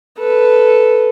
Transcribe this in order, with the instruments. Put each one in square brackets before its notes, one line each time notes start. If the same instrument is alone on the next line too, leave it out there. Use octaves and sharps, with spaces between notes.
[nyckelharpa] A4 B4